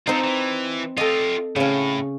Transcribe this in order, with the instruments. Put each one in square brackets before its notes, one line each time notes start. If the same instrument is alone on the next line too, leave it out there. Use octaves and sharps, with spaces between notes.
[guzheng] C4 D#4 [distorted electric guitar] F4 A4
[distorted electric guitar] E3
[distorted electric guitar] F4 G4 [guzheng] A4 D#5
[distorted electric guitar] A2 [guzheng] C#3 C#4